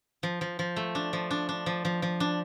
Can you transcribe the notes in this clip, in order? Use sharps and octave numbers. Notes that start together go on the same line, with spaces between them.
F3
F3
F3
A3
D4
F3
D4
D4
F3
F3
F3
D4